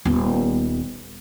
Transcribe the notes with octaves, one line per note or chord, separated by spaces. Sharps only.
D#1 B3